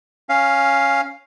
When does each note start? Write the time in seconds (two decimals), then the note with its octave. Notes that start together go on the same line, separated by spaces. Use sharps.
0.29 C#4 F5